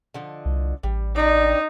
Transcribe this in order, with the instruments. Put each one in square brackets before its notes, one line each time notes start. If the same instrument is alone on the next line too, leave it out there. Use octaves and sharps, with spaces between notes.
[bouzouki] D3 F3 D#5
[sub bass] C2
[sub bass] A1 [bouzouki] G3
[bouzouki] D4 G4 D5 [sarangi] D#4